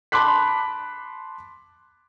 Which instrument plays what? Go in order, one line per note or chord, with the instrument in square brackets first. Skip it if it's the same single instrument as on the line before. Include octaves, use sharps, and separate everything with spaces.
[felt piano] A5 B5 C6 D6 F#6 B6